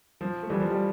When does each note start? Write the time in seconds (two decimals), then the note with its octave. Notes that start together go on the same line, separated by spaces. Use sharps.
0.21 F3
0.43 A3
0.50 E3 G3
0.60 F3
0.70 G3